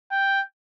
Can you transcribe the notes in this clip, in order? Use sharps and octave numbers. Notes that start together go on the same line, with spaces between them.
G5